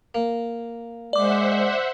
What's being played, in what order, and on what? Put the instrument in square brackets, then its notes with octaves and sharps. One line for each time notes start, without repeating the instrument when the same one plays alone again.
[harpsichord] A#3
[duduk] G#3 [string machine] C5 E5 F#5 [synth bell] D5 D6